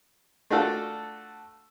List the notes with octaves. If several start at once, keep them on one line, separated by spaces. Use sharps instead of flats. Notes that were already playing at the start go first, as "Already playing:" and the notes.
A3 D4 F4 F#4 A4